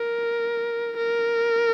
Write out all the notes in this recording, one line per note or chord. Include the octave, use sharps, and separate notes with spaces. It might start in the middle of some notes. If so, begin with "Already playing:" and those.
Already playing: A#4
A#4